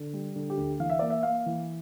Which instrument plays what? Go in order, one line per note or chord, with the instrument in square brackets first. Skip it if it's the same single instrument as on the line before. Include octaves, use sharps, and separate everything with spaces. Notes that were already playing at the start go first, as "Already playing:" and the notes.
Already playing: [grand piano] D3
G3
D3
G4
D2
E3 F5
E5
A#3 D5
E5
A#3 F5
E3